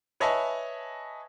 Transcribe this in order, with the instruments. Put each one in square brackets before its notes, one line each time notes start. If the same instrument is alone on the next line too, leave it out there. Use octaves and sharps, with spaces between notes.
[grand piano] B4 C#5 D#5 E5 G#5 A5